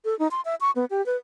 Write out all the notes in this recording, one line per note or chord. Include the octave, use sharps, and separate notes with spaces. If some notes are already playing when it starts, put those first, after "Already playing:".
A4
D#4
C6
E5
C#6
B3
G4
B4